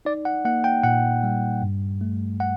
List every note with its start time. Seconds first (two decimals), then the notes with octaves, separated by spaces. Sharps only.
0.05 D#4 D5
0.25 F#5
0.45 A#3 F#5
0.64 G5
0.83 A#2 F#5
1.23 G3
1.62 G2
2.01 A3
2.40 F#5